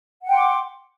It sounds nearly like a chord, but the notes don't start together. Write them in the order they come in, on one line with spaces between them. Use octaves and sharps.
F#5 G5 C6 D6